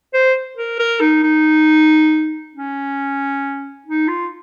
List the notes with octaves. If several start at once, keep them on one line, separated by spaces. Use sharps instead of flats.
C5
A#4
A#4
D#4
D#4
C#4
D#4
F4